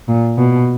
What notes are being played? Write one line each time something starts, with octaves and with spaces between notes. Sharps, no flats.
A#2
B2